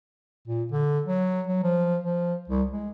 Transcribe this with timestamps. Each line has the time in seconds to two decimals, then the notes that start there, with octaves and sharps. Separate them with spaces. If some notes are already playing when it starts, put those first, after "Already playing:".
0.48 A#2
0.72 D3
1.06 F#3
1.47 F#3
1.63 F3
2.04 F3
2.49 C2
2.72 G#3